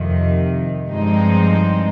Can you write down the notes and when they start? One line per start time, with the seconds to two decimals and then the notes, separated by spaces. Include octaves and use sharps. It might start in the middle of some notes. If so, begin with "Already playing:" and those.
Already playing: F2 C3 D#3
0.90 G2 F3 G#3 C4 D#4